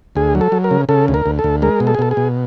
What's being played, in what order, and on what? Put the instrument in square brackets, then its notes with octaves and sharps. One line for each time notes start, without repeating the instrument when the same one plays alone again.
[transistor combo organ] D2 G#4
F#3
A4
F#3
A#4
C#3
C#3 A4
D2
A#4
D2
A4
D2
G#3 A#4
B2
A4
G#4
B2 A4
G#4
B2